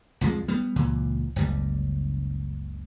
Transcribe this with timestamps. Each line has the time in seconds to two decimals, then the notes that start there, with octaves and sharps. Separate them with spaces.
0.21 C2 F2 F3 G#3
0.48 G3 B3
0.76 C#2 A#2 E3
1.36 F#1 C#2 G3